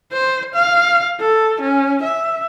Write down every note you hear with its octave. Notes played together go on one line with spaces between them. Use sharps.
C5
F5
A4
C#4
E5